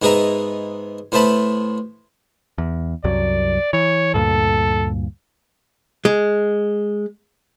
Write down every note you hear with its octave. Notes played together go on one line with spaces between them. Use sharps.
G#2 B3 G#4 D#5 E5 A#5
A2 B3 C5 E5 A5 B5
E2
C2 F#2 F#3 D5
E3 C#5
D2 G2 A#2 A4
G#3